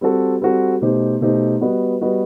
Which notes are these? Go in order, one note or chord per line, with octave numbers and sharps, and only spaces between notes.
G3 C4 F#4 A4
G3 C4 F#4 A4
B2 A3 D#4 G4 C5
B2 A3 D#4 G4 C5
G3 B3 F#4 B4 D#5
G3 B3 F#4 B4 D#5